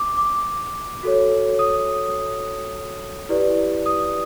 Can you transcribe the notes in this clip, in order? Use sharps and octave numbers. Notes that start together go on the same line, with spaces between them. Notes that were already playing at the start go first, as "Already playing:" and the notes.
Already playing: D6
D6
F#4 A4 C#5
D#6
E4 G4 B4 D5
D#6